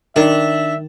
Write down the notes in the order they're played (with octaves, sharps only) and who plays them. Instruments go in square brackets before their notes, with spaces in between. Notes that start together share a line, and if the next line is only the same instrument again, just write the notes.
[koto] D#3 [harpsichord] D4 [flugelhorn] E5